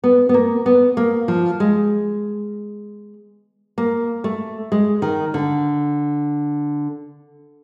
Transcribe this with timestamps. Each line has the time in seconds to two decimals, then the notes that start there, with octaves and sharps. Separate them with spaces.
0.04 B3
0.29 B3
0.34 A#3
0.66 B3
0.97 A#3
1.28 F3
1.60 G#3
3.78 A#3
4.24 A3
4.72 G#3
5.02 D#3
5.34 D3